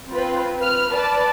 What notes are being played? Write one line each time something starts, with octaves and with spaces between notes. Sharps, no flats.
C4 F4 B4
B4 F6
B4 D5 A5